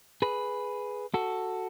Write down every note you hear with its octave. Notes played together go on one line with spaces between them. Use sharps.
G#4 B4
F#4 A4